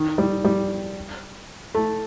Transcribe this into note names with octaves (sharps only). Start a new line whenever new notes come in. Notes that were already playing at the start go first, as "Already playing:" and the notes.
Already playing: D#3
G3
G3
A3